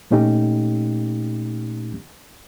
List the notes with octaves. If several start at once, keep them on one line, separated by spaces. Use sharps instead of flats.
A#2 A3 C#4 D#4 G4